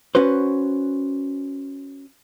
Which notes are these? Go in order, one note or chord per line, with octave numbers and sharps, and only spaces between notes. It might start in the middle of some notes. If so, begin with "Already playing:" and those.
C#4 F#4 B4 C5